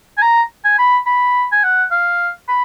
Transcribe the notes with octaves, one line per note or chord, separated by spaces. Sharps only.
G#5
A#5
G#5
B5
B5
G#5
F#5
F5
B5